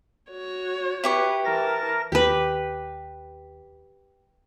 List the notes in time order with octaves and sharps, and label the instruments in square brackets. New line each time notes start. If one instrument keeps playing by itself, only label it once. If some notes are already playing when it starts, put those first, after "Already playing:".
[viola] F#4 C#5
[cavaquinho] E4 G4 C#6 [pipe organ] B4
[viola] E3 A5 [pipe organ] A#4 A#6
[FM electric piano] D#2 [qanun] G4 B4